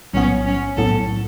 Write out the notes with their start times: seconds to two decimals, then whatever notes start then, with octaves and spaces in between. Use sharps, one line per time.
0.13 B1 A2 F#3 B3 C#4
0.46 C#4
0.77 B1 A2 F#3 B3 A4